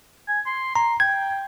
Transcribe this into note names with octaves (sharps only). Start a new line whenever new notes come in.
G#5
C6
A#5 C6
G5 G#6